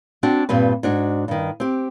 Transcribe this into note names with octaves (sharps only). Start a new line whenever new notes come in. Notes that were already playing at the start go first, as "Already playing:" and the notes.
C4 D4 F#4 G5
G2 A#2 G3 C4 B4
G#2 D4 F#4
G2 D#3
C4 G4